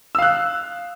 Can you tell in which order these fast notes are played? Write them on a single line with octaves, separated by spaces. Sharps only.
E6 F5 F#6